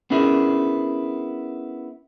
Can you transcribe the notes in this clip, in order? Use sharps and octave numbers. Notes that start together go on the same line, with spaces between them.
B3 C#4 D4 E4 G#4 A#4